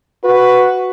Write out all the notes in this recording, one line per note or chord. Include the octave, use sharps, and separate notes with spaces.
F#4 B4